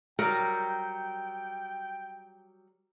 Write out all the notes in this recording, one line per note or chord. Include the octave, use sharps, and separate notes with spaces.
F#3 G3 A#4 G5